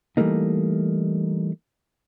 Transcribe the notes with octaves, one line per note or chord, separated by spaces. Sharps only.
E3 G3 A3 A#3 D#4